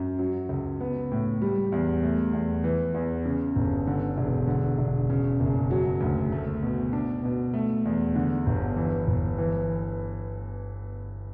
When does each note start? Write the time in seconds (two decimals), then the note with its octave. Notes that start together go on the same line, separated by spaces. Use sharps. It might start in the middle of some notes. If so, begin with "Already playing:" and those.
Already playing: F#2
0.19 F#3
0.49 C#2
0.81 B3
1.12 A2
1.42 G3
1.72 E2
2.03 A3
2.33 E2
2.64 E3
2.94 E2
3.26 C#3
3.56 G1
3.87 D3
4.17 E1
4.47 D3
4.78 E1
5.10 C#3
5.40 F#1
5.71 F#3
6.01 D2
6.32 A3
6.62 B2
6.93 D4
7.23 B2
7.53 A3
7.85 E2
8.16 D3
8.47 G1
8.77 E3
9.07 G1
9.38 E3